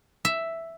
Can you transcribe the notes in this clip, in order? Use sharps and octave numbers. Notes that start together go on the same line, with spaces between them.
E5